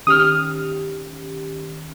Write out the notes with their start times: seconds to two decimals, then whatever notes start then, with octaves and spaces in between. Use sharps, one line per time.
0.07 D#3 C#4 G4 D#6 F6